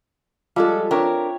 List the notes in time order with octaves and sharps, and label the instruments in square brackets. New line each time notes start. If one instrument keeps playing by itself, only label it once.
[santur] F3 [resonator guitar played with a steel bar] G3 G#3 A4
[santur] C4 C#5 E5 [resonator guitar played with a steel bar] D4 A#4